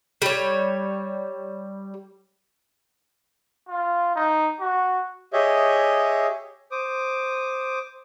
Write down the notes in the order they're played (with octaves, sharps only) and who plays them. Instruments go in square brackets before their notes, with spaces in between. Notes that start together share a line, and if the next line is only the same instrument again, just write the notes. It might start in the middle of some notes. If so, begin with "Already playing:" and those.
[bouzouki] G3 C#5
[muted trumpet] F4
D#4
F#4
[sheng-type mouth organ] G4 G#4 C#5 D#5 E5
C5 D6 D#6